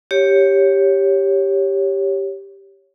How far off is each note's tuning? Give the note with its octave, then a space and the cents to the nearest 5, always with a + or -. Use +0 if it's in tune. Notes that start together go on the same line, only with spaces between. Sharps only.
G4 +0 C#5 +0